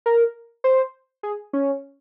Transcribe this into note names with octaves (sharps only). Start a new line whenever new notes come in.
A#4
C5
G#4
C#4